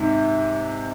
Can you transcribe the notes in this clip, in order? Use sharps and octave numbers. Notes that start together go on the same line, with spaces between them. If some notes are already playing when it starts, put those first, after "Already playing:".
Already playing: G#2 C3